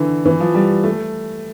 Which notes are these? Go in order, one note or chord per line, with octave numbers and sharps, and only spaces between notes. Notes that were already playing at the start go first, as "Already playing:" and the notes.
Already playing: D3 E3
E3
F3
G3
A3